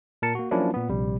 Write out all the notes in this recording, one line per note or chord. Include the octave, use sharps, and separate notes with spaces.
A#2 A#4 A5 C#7
A#3 F#4
F3 F#3 A#3 C#4 D4 E4
A#2 B3
A#1 C3 G3